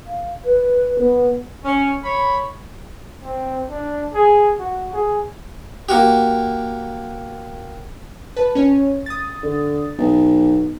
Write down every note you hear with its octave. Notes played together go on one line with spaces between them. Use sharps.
F5
B4
B3
C#4
C#5 B5
C4
D4
G#4
F#4
G#4
A#3 F#4 G4
B4 A5
C#4 C#5
D#6 A6
D3
B1